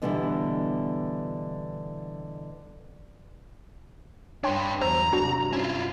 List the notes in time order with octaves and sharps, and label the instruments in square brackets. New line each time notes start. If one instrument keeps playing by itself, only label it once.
[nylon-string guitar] B2 D3 E3 G3 B3 E4
[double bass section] G2 [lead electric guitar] D4 B4 [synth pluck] C#5 G5 C6
[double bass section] E2 F#3 [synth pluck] C5 E6 [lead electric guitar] A#5
[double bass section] G2 C3 [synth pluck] D4 F#4
[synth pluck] C#4 [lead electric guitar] E4 F4